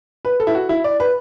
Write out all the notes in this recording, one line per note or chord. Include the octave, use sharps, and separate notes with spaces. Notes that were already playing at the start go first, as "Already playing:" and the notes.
B4
A4
E4
F#4
E4
D5
B4